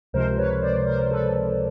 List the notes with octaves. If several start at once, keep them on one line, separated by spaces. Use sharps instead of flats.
C#2 C3 F3 G#3 A#4 C5
B4 C#5
C5 D5
A#4 C5
A4 B4